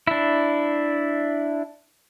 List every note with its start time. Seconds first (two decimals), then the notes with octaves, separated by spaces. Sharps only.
0.07 D4 E4